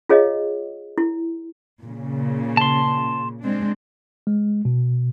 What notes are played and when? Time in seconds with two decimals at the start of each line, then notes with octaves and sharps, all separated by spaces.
0.09 F4 G#4 C#5 D#5 F5
0.98 E4
1.81 A#2 C#3
2.57 A5 C6
3.42 G#3 C4 D4
4.27 G#3
4.65 B2